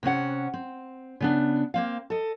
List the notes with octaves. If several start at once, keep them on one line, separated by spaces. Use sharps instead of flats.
C3 C4 C#4 F#5
C4
C#3 B3 D4
A#3 C4 F5
A4 D#5